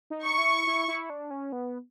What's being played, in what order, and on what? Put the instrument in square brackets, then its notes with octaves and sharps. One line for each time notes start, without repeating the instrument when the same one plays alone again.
[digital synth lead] D#4
[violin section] C#6
[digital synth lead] E4
E4
E4
D4
C#4
B3